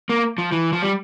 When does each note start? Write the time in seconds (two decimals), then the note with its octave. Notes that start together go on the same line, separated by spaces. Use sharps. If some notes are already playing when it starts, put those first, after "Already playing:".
0.10 A#3
0.38 F3
0.52 E3
0.73 F3
0.82 G3